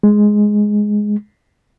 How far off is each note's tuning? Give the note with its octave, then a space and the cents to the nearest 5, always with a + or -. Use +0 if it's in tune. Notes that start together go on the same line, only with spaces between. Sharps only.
G#3 +5